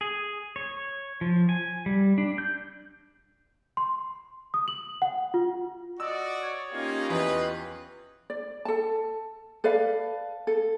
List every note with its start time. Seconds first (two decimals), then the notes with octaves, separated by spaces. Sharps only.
0.01 G#4
0.56 C#5
1.21 F3
1.49 G#5
1.86 G3
2.18 D4
2.38 G6
3.77 C6
4.54 D#6
4.68 F#7
5.02 F#5
5.34 F4
6.00 F#4 D5 D#5 E6
6.42 C#5
6.73 A#3 C#4 D#4 F4 G4
7.09 E2 B4 D#5
8.30 D5
8.65 A4 A5
9.64 A4 B4 D5 F5
10.47 A4